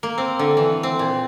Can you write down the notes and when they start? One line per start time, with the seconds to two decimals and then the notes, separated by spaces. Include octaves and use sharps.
0.03 A#3
0.18 C4
0.39 D3
0.57 E3
0.83 C4
0.99 A#2